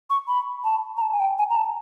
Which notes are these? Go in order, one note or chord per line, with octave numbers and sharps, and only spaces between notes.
C#6
B5
A5
A#5
A5
G#5
G5
G#5
A#5
A5